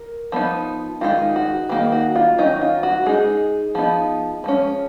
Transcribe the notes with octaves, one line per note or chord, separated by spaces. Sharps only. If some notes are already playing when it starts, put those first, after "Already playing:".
Already playing: A#4
F3 B3 D#4
D#3 G#3 B3 D#4 F4
F#4
D#3 A#3 D#4 G#4
F#4
F4
D#3 F#3 C#4 D#4
F4
F#4
G#3 D#4 G#4
F3 B3 D#4
F3 G#3 C#4